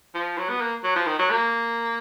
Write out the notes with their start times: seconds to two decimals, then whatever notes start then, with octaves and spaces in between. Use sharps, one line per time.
0.15 F3
0.38 F#3
0.49 B3
0.61 A#3
0.84 F#3
0.96 F3
1.07 D#3
1.19 F#3
1.30 A#3